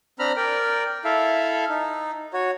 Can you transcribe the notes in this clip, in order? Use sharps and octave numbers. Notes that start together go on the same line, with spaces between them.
C4 D4 A#5 B5 F6
A#4 D5 G5
E4 A4 E5 F5
D#4
F#4 C#5